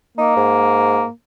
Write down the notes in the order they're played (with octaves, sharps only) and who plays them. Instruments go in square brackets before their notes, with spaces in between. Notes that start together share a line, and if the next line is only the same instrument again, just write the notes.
[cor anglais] A#3 [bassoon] D#4
[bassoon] G#2